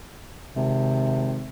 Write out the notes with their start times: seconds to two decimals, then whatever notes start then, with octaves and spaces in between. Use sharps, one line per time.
0.56 G#1 C3